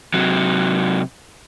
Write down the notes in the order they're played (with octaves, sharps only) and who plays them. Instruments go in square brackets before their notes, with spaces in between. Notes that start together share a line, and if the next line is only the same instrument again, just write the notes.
[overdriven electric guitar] C3 F#3